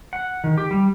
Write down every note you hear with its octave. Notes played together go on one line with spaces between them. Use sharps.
F#5
D#3
G4
G3